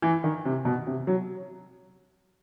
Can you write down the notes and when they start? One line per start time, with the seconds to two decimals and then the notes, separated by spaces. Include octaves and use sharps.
0.02 E3
0.24 D#3
0.45 C3
0.65 B2
0.87 C3
1.07 F#3